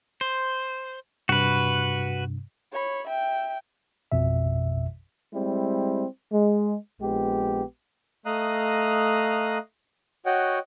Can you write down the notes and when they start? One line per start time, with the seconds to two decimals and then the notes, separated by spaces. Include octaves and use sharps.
0.21 C5
1.29 G2 C3 F#4 B4
2.72 C#5 B5
3.07 E5 G5
4.12 A1 F2 B2 E5
5.34 G3 G#3 C4 E4
6.32 G#3
7.01 A#1 G#3 B3 G4
8.26 A3 D#5 F5 A#5 D#6 F#6
10.26 F#4 C#5 D#5 F#5 G5